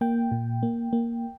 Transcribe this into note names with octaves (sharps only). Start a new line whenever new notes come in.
A#3 G5
A#2
A#3
A#3